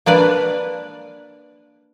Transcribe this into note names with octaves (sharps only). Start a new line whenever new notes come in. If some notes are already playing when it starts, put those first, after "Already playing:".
A#3 D4 B4 D5